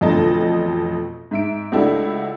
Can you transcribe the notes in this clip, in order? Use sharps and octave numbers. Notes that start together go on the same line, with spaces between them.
A1 F2 B2 D3 D#5 A5
G#2 E5 D7
C#2 A3 D4 E4 F#4 G4